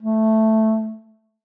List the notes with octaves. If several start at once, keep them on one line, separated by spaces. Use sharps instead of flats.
A3